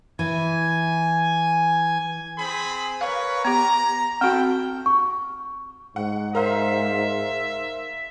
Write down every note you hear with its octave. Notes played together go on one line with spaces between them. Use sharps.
E3 G#5
C4 G#4 B5
A#4 B4 C#5 F5
B3 G4 A#5
C4 E4 F#4 A4 G5
C#6
G#2 F#5
A#4 C5 E5 F5 A#5